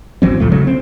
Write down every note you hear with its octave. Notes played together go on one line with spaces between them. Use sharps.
G#1 E3 F#3 C4
C#2 A#2 F3 A3
C#3 F#3 A3
C4